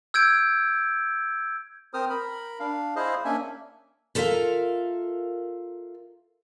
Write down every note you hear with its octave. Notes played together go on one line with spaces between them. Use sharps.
E6 G6 G#6 D7
C4 A#4 C5 D#6 F6
A#4 B5
D4 F5
E4 G#4 C5 D#5 F5
A#3 C#4 D4 E5 G#5
F4 A4 A#4 E5 F5